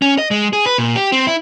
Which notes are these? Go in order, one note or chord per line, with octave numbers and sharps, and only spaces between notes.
C#4
D#5
G#3
G#4
B4
A#2
G4
C4
E4